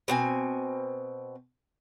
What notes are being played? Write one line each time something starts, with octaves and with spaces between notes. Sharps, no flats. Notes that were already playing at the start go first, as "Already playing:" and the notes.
B2 C4 G#5